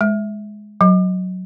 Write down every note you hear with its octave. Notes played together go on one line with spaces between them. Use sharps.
G#3
F#3